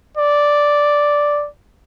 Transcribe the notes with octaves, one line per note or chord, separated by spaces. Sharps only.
D5